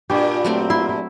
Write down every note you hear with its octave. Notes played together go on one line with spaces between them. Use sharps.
G2 A#2 G4
F#3 A3 C4
E4 C6
E4